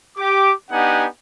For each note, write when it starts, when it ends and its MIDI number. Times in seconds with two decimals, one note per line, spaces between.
0.17 0.53 67
0.17 0.53 86
0.71 1.06 59
0.71 1.06 62
0.71 1.06 63
0.71 1.06 67
0.71 1.06 78
0.71 1.06 80